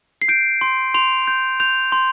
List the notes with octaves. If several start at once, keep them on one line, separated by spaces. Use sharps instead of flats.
C7
G6 D7
C6
C6 F7
G6
G6 F7
C6